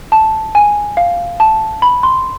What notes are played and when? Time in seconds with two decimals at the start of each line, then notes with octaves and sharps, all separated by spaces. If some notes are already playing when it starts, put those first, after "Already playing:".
0.12 A5
0.55 G#5
0.97 F5
1.40 A5
1.82 B5
2.03 C6